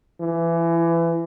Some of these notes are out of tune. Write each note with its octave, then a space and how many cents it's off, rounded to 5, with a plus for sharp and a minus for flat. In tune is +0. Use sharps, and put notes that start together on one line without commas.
E3 +25